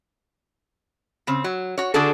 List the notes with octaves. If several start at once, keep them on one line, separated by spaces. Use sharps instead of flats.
C#3 C4
F#3
F#4 C#5
D3 D4 F#4 G#4 A4